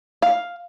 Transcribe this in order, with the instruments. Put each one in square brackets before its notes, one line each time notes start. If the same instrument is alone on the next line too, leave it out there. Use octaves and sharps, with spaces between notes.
[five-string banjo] F5